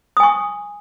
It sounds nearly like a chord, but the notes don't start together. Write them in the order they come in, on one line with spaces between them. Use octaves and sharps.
D#6 G#5 C#6